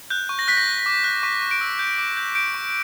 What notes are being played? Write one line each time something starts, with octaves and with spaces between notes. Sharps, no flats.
F#6 G6
C#6
A#6
F#6 B6
A#6
F#6
D6
F#6
C#6 B6
C#6
D7
E6
G6
D6
G6
G6 D7
C#6